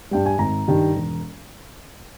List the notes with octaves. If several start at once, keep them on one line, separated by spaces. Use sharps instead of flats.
G2 G3 G5
G#5
G#1 A#5
G2 D#3 G3
E1